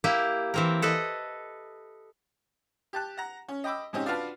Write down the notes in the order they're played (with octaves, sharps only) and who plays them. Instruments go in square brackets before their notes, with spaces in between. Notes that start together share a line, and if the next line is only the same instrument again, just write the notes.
[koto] A#3 E4 G4
E3 C4 A#4
A4 B4 D#5
[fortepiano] G4 A5 F#6
F#5 A#5
C#4
D#5 G5 B5 D6 E6
G#2 C#3 C4 C#4 D#4 G4
D4 F4 F#4 B4 F5 A5